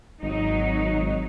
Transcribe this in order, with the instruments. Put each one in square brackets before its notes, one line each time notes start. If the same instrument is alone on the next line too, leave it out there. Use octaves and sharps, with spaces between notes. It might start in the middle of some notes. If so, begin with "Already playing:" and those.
[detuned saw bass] G#1 [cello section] F#3 D#4